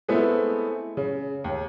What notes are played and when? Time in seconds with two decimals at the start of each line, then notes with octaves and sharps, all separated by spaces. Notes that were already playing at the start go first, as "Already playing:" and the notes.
0.08 G#3 A3 B3 C4 E4
0.97 C#3
1.44 D#2